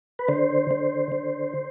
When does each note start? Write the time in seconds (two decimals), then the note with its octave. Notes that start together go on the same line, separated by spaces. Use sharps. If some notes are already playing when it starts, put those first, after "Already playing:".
0.19 B4
0.28 D3 C5
0.71 D3
1.12 D3